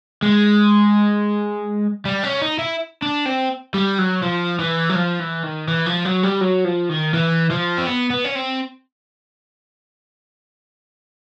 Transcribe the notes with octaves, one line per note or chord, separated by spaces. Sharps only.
G#3
G3
C#4
D#4
E4
D4
C4
G3
F#3
F3
E3
F#3
F3
E3
D#3
E3
F3
F#3
G3
F#3
F3
D#3
E3
F3
C4
B3
B3
C#4
C4